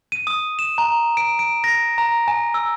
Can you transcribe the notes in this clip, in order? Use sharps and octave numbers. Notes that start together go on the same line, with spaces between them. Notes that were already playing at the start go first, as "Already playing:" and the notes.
D#7
D#6
E7
A#5
D7
D7
A#6
A#5
G#5
E6